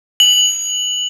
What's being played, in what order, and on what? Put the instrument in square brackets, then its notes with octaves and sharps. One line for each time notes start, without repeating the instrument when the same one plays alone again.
[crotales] F#7